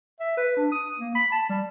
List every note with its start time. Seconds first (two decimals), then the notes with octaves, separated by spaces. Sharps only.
0.20 E5
0.37 B4
0.57 D4
0.72 D#6
0.99 A#3
1.15 B5
1.32 A5
1.49 G3